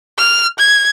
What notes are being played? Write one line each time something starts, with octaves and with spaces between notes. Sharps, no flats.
F6
G#6